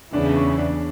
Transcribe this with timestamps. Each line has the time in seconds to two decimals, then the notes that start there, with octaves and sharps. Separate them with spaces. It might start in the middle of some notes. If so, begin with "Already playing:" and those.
0.13 E2 C#3 E3 B3 D4 E4
0.36 C#4
0.58 D4